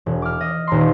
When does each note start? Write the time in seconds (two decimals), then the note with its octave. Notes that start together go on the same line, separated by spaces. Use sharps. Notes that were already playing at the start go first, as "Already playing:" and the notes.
0.06 E1
0.22 D6 F6
0.41 D#5
0.67 D#1 A#5 C6